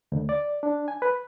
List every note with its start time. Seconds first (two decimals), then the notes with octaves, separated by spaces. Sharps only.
0.12 D2
0.29 D5
0.63 D4
0.88 G#5
1.02 B4